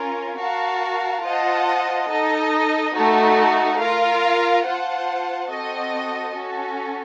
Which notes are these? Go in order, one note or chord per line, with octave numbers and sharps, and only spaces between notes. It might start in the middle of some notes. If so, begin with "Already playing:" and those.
Already playing: C#4 F4 A#4
F#4 A#4 F5 A5
F4 C5 D#5 F#5 A5
D#4 A4 D#5
A3 D#4 F#4 A4
F4 A#4 F5
F4 C5 F#5 A5
C4 F#4 A4 D#5
C#4 F#4 A4